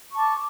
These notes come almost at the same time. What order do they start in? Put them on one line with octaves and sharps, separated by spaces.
C#6 A5 D6